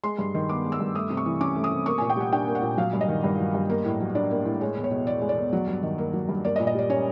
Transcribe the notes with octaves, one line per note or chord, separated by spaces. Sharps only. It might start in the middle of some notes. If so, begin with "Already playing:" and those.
G#3 C6
G2
D#3
B3 D6
G#3
E6
G2
A3 D#6
C3
C#6
E3
C#4 D6
A3
D#6
C3
A#3 C#6
A#2 G#5
G5
G3 F#5
D4 G5
A#3
F#5
A#2
F#3 F5
G2
D#5
D#3
G2
F#3
G2
A#3
A2
F#3
D4 D5
A#3
A2
G#3 C#5
E2
C#5
B2
E2 D5
G#3
D5
E2
F#3
G2
D#3
A#3
F#3
G2
A#3 D5
D#5
A#2
D#5
G3 D5
C#4 C#5